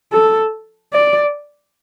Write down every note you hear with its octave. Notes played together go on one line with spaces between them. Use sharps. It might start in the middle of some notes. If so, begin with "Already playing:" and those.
A4
D5